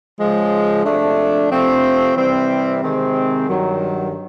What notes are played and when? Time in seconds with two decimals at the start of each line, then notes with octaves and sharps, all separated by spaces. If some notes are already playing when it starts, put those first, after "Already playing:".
0.18 C#3 F3 G#3
0.84 C3 F3 A3 D4
1.50 C3 F3 A3 C4
2.15 C3 E3 G3 C4
2.81 C3 D#3 G#3 C4
3.47 G2 D#3 F#3